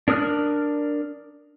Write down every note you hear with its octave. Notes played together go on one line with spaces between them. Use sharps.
D4 A#4 D#6 F6 F#6